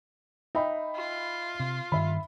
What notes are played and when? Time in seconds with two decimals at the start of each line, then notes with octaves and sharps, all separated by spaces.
0.55 D#4 E5 G5 B5
0.95 F4
1.60 C3
1.92 G2 D#3 E5 B5